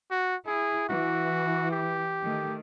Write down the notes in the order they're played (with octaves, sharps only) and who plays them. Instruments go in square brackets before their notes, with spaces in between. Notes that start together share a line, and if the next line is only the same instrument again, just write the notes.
[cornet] F#4
[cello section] E4 [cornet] G#4
[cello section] E3 [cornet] F#4
[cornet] G4
[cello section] D#3 A3